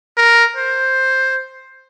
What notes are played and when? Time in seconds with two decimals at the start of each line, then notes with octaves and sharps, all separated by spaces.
0.18 A#4
0.56 C5